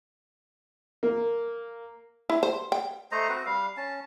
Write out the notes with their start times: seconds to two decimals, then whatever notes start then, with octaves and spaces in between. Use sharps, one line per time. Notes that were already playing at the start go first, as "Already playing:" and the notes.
1.03 A#3
2.30 E4
2.43 C5
2.72 G5
3.12 A3 C5 D#5 A#5
3.29 C4 F#4 B4
3.45 G3 F5
3.77 C#4 A5